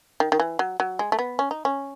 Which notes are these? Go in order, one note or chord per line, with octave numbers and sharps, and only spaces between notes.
D#3
D#3
E3
F#3
F#3
G#3
A3
B3
C#4
D#4
C#4